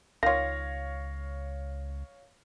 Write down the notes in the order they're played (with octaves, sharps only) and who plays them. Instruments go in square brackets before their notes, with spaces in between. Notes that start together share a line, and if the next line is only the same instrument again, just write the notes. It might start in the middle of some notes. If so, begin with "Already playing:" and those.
[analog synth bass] C#2 [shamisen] D#3 F4 [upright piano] C#5 F5 [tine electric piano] A#6